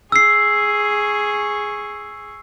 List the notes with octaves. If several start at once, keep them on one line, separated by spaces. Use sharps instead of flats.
G#4 C#6 E6 C7